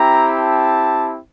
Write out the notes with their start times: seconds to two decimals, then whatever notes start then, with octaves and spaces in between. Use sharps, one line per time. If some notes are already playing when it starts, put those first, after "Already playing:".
Already playing: C4 E4 G4 A#5
0.39 A5